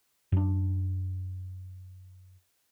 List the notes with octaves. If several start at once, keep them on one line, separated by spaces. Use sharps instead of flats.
F#2 D4